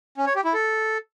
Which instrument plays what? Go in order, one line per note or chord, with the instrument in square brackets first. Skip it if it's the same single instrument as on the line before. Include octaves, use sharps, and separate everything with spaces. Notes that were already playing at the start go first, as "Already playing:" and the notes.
[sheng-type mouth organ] C#4
C#5
G4
E4
A4